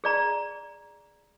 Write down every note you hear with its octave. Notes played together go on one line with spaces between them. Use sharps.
G#4 D5 A#5